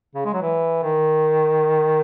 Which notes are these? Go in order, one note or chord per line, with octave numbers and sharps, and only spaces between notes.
C#3
G#3
F#3
E3
D#3